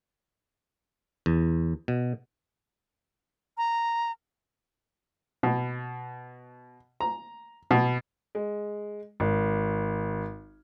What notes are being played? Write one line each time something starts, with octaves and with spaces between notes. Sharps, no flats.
E2
B2
A#5
B2
A#5
B2
G#3
G#1